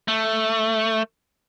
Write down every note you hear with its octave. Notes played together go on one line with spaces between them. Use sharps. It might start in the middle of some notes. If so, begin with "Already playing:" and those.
A3